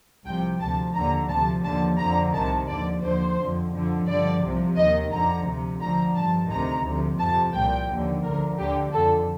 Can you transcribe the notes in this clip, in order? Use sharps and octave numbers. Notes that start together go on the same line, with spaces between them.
C2 C3 F3 G5
D2 C3 F3 A5
D#2 D3 F3 A#5
D2 C3 F3 A5
D#2 D3 F3 A5
F2 D3 F3 A#5
C2 C3 D#3 A5
D#2 D3 F3 D5
D#2 D3 F3 C5
F2 D3 F3
F2 D3 F3
G2 D3 F3 D5
C2 C3 F3
D#2 D#3 D#5
F2 D3 F3 A#5
D2 C3 F3
D2 D3 F3 A#5
G2 F3 A5
D2 C3 D#3 A#5
D2 C3 F3
F2 C3 F3 A5
C2 A#2 F3 G5
D#2 D3 F3
D2 D3 F3 A#4
D2 D3 F3 G4
F2 D3 F3 A4